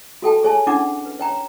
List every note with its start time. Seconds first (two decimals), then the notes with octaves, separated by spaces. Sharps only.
0.22 F#4 A4 G5 A5
0.43 G#4 C#5 G#5 A5
0.67 C#4 D4 E4 F#5 D6
1.06 B4
1.19 C#5 G5 A#5